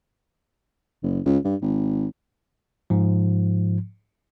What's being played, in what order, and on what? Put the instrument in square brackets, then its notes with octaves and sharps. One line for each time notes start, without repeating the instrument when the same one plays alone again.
[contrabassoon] F#1
C#2
G2
G#1
[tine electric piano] G#2 F3